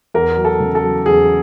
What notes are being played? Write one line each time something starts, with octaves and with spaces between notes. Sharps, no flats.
E2 A#4
F#3
A4
C#3
A4
F#3
E2 G#4